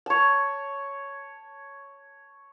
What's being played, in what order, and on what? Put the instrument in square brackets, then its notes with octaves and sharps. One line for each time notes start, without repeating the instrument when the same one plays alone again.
[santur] C#5 A5